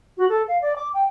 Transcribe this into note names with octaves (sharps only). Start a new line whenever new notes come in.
F#4
A4
F5
D5
D6
G5